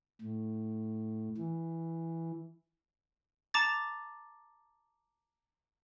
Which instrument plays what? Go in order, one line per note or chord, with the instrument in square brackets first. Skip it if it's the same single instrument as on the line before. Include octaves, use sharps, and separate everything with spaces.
[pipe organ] A2
E3
[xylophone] A5 A#5 D6 A6